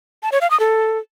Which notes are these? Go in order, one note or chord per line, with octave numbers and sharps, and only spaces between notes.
A5
C#5
F5
D#6
A4